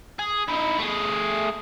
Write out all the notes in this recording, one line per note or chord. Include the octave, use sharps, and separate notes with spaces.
G#4
D#4 E4
A3 G#4